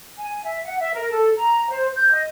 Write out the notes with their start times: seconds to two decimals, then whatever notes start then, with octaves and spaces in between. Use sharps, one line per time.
0.18 G#5
0.44 E5
0.64 F#5
0.79 E5
0.95 A#4
1.10 A4
1.36 A#5
1.69 C5
1.95 G6
2.12 D#5